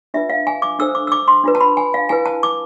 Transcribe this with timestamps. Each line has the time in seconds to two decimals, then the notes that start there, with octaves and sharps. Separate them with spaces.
0.14 D4 F4 B4 E5
0.30 F5
0.47 G#5
0.62 D6
0.79 D4 A4 C5 E6
0.95 D6
1.07 E6
1.12 D6
1.28 C6
1.44 D4 F4 B4
1.55 A5
1.61 B5
1.77 G#5
1.94 F5
2.09 E4 B4 G#5
2.26 A5
2.43 D6